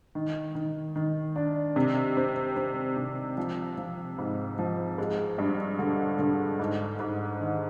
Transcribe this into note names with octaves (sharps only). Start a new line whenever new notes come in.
D#3
D#3
D#3
D4
C3
C4
C4
C3
F3
F3
G#2
F3
G#3
G2
D3
D3
G#2
G#2
D#3